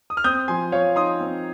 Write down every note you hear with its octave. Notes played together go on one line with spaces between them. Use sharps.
D#6
F6
C4 D#6 G6
F3 G#5 C6
F3 C#5 F5
D#4 C6 D#6
C4